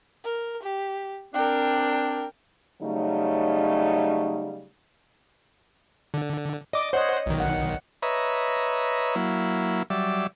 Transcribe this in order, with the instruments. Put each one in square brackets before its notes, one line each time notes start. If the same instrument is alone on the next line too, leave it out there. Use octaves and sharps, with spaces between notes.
[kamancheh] A#4
G4
[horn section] C4 D4 [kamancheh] A#4 G5
[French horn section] C#3 F#3 G3 A3 D#4
[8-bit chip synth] D3
[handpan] D5 [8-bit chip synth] D#5 D6
[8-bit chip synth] C5 F#5 [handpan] C#5 D#5
[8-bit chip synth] B1 D#3
[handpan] F#5
[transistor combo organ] B4 C#5 D#5 E5 A#5
F#3 A#3 E4
F#3 G3 D5 E5